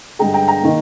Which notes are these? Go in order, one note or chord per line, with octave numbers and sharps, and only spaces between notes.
G2 D3 G#3 G5 A#5
G5 A#5
G5 A#5
D#3 A#3